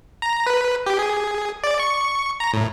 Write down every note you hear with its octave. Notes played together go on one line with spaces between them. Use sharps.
A#5
B4
G4
G#4
D5
C#6
A#5
A2